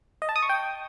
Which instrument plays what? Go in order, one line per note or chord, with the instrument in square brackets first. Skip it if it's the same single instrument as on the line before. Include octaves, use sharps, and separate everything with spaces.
[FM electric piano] D#5
A5
D#6
C#6
G5